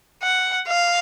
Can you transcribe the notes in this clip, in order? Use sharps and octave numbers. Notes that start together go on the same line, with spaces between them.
F#5
F5